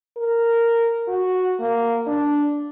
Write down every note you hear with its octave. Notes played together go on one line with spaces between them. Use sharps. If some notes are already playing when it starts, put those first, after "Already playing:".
A#4
F#4
A#3
D4